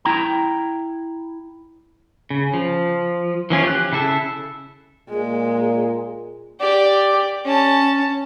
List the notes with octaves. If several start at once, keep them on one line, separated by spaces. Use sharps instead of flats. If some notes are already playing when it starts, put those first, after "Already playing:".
E4 G5 A#5
C#3
F3
E3 F3 C#4 F4
G4 F#6
C#3 E4 A4 E5
A#2 G#3
G4 D5
C#4 A5